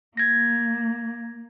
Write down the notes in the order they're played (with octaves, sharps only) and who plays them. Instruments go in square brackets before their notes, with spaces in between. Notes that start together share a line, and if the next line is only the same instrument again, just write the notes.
[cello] A#3 [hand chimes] G#6 A#6